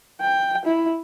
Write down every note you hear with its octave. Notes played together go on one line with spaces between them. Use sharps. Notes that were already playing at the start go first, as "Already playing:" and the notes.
G5
E4